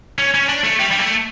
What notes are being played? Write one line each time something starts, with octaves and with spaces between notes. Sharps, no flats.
C#4
C#4
D4
A3
G3
G3
A3